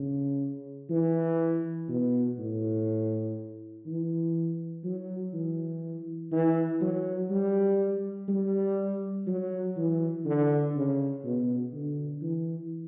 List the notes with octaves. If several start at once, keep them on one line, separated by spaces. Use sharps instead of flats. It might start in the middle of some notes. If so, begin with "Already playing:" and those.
Already playing: C#3
E3
B2
A2
E3
F#3
E3
E3
F#3
G3
G3
F#3
E3
D3
C#3
B2
D3
E3